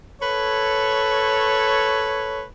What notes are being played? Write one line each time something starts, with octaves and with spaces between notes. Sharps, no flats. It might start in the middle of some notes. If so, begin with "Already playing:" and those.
A4 B4 C#5